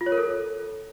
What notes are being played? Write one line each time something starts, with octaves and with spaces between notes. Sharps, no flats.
F4
C#5
A#4
A4